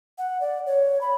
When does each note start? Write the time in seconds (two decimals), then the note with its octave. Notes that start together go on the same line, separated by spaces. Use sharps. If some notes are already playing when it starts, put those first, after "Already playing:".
0.18 F#5
0.41 D5
0.66 C#5
1.01 B5